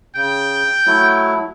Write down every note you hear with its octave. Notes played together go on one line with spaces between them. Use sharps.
C#3 G5
F#3 A3 E4